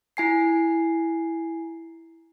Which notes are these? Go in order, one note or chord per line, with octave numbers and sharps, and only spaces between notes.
E4 G#5 C7